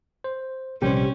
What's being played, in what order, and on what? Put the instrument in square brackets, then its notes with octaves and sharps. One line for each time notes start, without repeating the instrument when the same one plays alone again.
[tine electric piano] C5
[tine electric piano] A#1 C3 G3 [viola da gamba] C#4 [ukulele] G4 C5